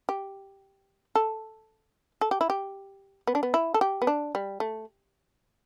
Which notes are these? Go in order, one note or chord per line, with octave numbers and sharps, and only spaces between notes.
G4
A4
A4
G4
E4
G4
B3
D4
B3
E4
A4
G4
B3
D4
G3
A3